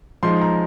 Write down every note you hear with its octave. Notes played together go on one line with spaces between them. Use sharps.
F3 G#3 D#4 C6
A#5